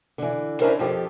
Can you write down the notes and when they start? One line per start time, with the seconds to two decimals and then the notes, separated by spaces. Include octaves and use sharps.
0.18 D3 E3
0.60 C#4 D4 E4 A4 A#4 C5
0.79 F2 F3 G4 A4